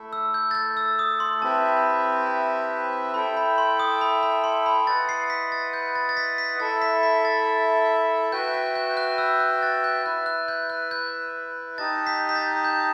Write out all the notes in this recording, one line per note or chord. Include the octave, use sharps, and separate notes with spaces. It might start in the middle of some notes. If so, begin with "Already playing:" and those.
Already playing: A3 E4 A4 E5
E6
G6
A6
G6
E6
D#6
C6
C4 E4 G4 B4 E5 A5
E4 A4 E5 G5 B5
B5
C6
D#6
B5
B5
C6
B5
E4 B4 D#5 F#5 A6
C7
B6
A6
G6
A6
A6
B6
B6
E4 A4 E5 A6
B6
B6
A6
F#4 B4 E5 G5 G6
G6
G6
F#6
E6
F#6
A6
G6
E4 B4 E5 F#6
F#6
G6
F#6
G6
D#4 G4 D#5 A5 A6
B6
B6
A6
G6